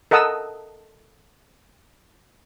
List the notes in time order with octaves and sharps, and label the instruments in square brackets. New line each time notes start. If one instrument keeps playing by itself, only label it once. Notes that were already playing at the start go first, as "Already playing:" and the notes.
[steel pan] A4 A#4 D#5 F#5 D#6 E6